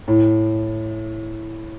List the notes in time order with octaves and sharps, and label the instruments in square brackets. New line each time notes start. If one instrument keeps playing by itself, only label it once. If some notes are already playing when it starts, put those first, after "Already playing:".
[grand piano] A2